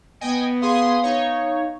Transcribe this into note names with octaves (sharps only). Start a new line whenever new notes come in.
B3 D#5 G5 G#5
G#4 F5 C6 D#6
D#4 C#5